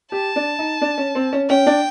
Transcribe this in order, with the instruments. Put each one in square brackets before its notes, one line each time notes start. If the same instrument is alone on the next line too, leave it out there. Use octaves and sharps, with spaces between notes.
[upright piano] G4 [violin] A5
[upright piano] D4
D#4
D4
C#4
C4
C#4
[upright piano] C#4 [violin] G5
[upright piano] D4